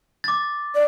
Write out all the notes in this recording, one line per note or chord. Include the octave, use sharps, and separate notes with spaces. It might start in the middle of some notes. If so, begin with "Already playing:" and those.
D6 A6
D5